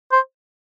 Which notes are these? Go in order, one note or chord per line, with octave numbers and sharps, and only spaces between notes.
C5